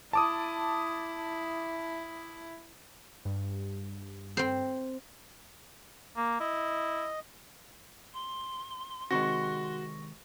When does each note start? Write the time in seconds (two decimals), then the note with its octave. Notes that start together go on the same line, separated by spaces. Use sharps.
0.13 E4 A5 D6 D#6
3.25 G2
4.37 C4 C5
6.17 A#3
6.40 E4 D#5
8.13 C6
9.11 C3 D#3 G#3 F#4 C#6 A#6